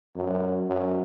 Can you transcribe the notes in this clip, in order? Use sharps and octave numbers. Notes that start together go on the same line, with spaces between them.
F#2
F#2